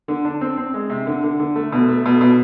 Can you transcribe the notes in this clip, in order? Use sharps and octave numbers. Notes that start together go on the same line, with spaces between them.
D3
D4
C4
C4
G#3
C3
D3
D3
D3
A3
B2
A3
B2
B2